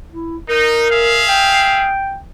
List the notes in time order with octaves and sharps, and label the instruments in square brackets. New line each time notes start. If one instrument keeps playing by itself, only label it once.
[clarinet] E4
[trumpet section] D#4 [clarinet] A#4
[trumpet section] G#4 E5 F5
[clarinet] G5